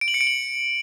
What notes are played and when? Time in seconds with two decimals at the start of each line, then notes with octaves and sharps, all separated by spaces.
0.01 D7
0.08 F#7
0.14 C#7
0.21 D7
0.27 F#7